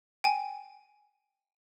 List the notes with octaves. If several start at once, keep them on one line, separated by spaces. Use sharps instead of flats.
G5 G#5